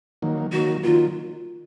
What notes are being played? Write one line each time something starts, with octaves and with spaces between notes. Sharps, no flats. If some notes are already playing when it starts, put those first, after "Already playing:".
D#3 F#3 A#3
D#3 F#3 A#3 F#4
D#3 F#3 A#3 F4